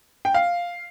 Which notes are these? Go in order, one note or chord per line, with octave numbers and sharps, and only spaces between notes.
G5
F5